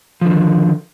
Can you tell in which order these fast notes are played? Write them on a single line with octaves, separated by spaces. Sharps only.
F3 D3 D#3